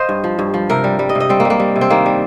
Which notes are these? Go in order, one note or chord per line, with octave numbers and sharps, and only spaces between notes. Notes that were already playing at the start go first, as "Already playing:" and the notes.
Already playing: C5 D#5 F5
G2
F3
G2
F3
C3 A#4
G3
G3
D#5
C3
D#5
G3 C4
A#3
G3
A#3
G3
C3
C4
D#3 A#3
G3